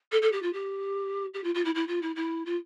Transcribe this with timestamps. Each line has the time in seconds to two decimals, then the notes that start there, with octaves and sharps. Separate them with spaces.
0.12 A4
0.22 A4
0.32 G4
0.42 F4
0.53 G4
1.34 G4
1.44 F4
1.54 F4
1.65 E4
1.75 E4
1.87 F4
2.02 E4
2.15 E4
2.45 F4